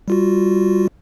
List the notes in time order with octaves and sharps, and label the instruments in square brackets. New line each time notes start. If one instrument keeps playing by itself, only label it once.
[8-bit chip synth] G3 F4 F#4